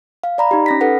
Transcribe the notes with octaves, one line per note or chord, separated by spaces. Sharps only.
F5
D5 A#5 B5
D#4 G4
C#4 A#6 B6
A4 B4 F#5